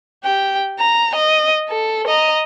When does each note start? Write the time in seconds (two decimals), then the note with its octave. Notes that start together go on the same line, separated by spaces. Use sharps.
0.24 G4 G5
0.79 A#5
1.15 D#5
1.69 A4
2.07 D#5 A#5